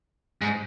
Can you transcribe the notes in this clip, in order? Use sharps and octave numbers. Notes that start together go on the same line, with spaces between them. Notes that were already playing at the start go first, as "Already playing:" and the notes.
G#2